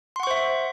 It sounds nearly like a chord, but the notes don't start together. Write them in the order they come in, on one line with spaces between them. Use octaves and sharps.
C6 F#5 C#6 C5 E5